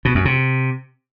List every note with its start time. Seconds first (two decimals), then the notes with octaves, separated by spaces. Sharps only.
0.05 B2
0.15 F#2
0.25 C3